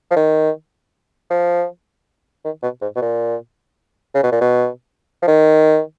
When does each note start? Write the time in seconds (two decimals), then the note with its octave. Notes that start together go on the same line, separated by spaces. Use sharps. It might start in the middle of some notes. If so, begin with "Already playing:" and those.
0.11 F3
0.16 D#3
1.30 F3
2.45 D#3
2.63 B2
2.81 G#2
2.96 B2
3.02 A#2
4.14 C#3
4.23 B2
4.32 A#2
4.41 B2
5.22 F3
5.28 D#3